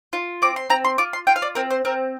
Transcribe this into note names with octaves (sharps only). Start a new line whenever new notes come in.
F4
C4 D6
C6
C4 A#5
C6
F4 D6
C6
F4 G5
F5
D5
C4 A#4
C5
C4 A#4